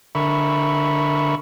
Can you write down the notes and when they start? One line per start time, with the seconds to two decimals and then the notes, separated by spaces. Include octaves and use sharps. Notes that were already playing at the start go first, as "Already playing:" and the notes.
0.15 D3 A#4 E5 B5 C#6